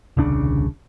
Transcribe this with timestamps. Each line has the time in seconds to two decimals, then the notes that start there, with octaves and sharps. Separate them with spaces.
0.17 D#1 C2 C#3 D4